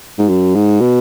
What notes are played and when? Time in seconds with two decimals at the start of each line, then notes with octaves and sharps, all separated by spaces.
0.19 G#2
0.29 F#2
0.55 G#2
0.81 B2